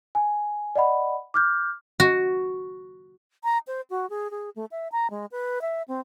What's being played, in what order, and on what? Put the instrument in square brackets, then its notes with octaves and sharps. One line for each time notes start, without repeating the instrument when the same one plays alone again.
[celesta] G#5
D5 D#5 F#5 B5
D6 F6 G6
[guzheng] F#4
[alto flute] A#5
C5
F#4
G#4
G#4
A3
E5
A#5
G#3
B4
E5
C4